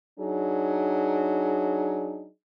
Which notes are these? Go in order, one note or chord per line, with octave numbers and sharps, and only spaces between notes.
F#3 D4 D#4 G#4